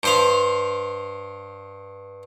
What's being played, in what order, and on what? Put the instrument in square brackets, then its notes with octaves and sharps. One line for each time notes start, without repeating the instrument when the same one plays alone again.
[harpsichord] G2 C5 F5